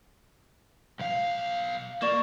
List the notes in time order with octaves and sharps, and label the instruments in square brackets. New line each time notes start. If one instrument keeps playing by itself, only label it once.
[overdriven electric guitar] B1 F5
[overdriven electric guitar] A#3 [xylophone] D5 C#6 E7